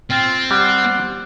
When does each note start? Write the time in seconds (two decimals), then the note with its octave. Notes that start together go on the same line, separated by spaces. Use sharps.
0.11 C4 F4
0.51 G3 F#5